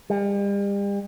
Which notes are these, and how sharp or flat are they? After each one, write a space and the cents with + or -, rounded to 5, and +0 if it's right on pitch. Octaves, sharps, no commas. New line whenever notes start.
G3 +40